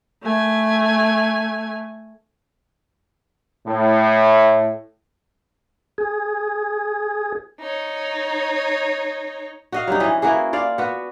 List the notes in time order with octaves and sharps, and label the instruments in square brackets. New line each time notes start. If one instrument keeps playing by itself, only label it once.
[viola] A3 G#5
[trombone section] A2
[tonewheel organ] G#4
[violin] D#4 C#5
[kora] F#4 D#5 F5
F#3 G3 D#4
E3 C#4 D#5
A#3 E4 F#4 G#4
F4 D5 F5
B3 F#4